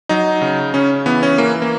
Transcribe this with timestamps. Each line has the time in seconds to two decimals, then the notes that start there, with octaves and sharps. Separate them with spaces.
0.09 F#3 D#4
0.42 C#3
0.74 C#3 C#4
1.06 E3 B3
1.23 C#4
1.38 E3 A#3
1.62 A#3